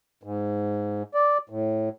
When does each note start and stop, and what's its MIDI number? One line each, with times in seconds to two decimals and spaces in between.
0.23 1.03 44
1.14 1.38 74
1.50 1.89 45